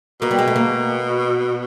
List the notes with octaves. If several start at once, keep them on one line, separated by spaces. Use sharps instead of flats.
B2 A#3
G3
G#3
A3
A#3